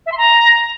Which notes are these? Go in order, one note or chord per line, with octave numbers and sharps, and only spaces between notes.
E5
C6
A#5